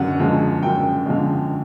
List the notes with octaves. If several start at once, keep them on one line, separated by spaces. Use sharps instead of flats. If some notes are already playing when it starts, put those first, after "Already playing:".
Already playing: F#2 D3 F#5
D3 F3 G#3
F#2 G5
D3 F3 G#3